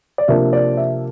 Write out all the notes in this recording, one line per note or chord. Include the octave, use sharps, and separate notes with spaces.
D5
C3 F3 A#3 D4 E5
D5
E5